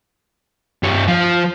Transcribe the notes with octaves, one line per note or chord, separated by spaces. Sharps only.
G2 C#5
F3